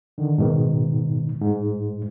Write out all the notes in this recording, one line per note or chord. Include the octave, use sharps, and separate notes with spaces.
D3 D#3
G#2 B2 D#3
G#2